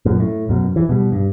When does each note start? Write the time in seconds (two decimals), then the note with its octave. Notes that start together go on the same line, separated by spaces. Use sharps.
0.05 F#2 A#2
0.20 A2
0.49 F#2 B2
0.76 E3
0.89 B2 G3
1.12 G2